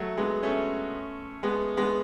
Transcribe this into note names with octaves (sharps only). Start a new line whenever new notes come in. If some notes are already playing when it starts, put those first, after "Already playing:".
Already playing: F#3 A3
G#3 B3
A3 C#4
G#3 B3
G#3 B3